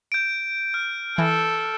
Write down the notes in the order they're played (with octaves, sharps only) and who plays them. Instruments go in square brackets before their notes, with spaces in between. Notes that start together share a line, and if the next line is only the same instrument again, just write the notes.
[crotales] G6 D7
F6
[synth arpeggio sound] E3 [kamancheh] A4